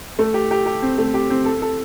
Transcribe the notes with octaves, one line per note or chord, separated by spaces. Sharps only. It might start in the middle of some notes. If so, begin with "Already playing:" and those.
A3
G4
G4
G4
C4
A3
G4
C4
A4
A4